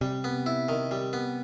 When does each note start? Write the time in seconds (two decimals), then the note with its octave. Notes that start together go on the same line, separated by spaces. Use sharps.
0.01 C3 G3
0.24 B3
0.46 E4
0.69 D#3
0.91 G3
1.13 B3